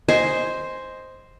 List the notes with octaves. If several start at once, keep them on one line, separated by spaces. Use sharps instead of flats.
C5 D#5 G#5